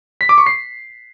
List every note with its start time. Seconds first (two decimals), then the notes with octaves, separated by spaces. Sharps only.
0.21 B6
0.29 D6
0.38 C#6
0.46 C7